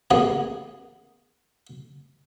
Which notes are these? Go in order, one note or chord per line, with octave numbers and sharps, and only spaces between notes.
A1 A#3 B3 G#4